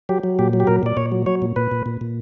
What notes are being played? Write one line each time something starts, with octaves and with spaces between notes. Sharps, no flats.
F#3 G4
F#3
A#2 G4
F#3
G4
A#2 A#4
A#2 D5
A#2 C#5
F#3
F#3 C#5
A#2
A#2 B4
A#2
A#2
A#2